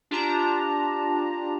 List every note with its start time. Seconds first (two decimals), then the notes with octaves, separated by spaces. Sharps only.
0.11 D4 F4 G4 A5 A#5